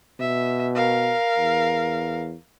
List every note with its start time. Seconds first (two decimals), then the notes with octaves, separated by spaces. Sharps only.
0.20 B2 E5
0.75 A#4 F5
1.37 E2